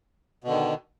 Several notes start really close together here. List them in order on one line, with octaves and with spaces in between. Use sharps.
B2 D3 D#3